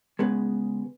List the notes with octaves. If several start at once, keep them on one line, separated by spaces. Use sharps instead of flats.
C#2 C#3 G#3 B3